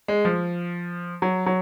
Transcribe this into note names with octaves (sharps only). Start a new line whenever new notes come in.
G#3
F3
F#3
F#3